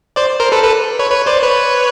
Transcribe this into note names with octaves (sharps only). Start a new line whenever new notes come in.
C5 D5
A#4 C5
A4 B4
A4 B4
B4 C#5
B4 C#5
C5 D5
B4 C#5